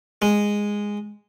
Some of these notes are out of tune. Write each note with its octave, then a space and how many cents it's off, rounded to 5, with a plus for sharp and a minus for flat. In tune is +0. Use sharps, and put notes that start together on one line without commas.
G#3 -10